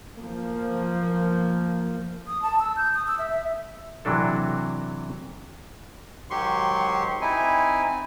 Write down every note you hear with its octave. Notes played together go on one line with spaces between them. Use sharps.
F3 A#3
D#6
A5
E6
G6
D#6
E6
E5
E5
C3 E3 F#3 D4 A4
G#2 D#3 F#3 G4 C6 C#6
C4 D#4 E4 G#5